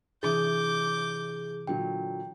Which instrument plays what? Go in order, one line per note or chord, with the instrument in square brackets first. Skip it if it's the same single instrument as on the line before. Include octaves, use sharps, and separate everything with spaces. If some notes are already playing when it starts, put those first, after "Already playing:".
[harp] C3 E3 D#6 [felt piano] D4 [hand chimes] G#4 [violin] D6 G6
[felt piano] A#2 D3 F#3 [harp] C#5 [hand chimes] G5